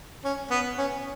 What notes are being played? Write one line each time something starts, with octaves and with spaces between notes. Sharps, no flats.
C#4
B3
C#4